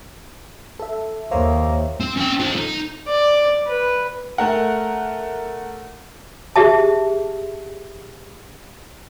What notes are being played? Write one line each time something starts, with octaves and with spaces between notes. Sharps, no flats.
A4 E5
D#2 A#3 C5 C#5 E5
C4
C#4 G5
F4 A4
D#4
D5
B4
A3 A#4 F#5
G4 G#4 E5 A5